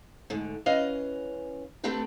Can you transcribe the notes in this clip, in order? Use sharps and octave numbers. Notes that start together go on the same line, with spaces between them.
D2 G#2 D3
E3 C#4 B4 D#5 F5
A3 B3 C4 D4 G4 B4